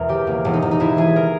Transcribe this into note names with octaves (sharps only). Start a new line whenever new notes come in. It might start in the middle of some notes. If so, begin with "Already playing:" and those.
Already playing: E1 E2 A#4
C#3 G4
E1 A#3
E1
D#4
E1
D#4
E1 E4
E3 G#4
A#4